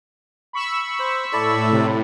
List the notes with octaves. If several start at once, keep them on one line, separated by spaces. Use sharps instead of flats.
B5 C#6 E6
C5
A2 E4 A4 D5
C3